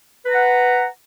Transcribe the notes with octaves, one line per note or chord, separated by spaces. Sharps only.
B4 F#5 A#5